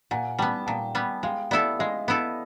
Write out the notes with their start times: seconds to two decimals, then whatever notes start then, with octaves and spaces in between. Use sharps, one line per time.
0.11 A#2 F#5 G#5
0.39 G3 B3 G5 A5
0.67 A#2 G5 A5
0.95 G3 B3
1.23 G#3 F5 G5
1.51 B3 E4 A4 D5 E5
1.79 G#3 D#5 F5
2.08 B3 E4 A4